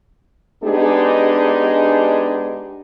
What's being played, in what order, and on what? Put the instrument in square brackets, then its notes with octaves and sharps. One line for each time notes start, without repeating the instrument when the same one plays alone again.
[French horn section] G#3 B3 D4 D#4 G4 G#4